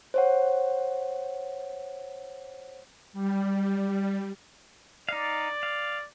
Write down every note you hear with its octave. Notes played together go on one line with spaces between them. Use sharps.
C5 C#5 F#5
G3
D#4 D5 F5
F5